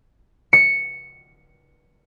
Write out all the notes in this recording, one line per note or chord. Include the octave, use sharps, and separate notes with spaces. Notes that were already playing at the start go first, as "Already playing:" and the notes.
C#7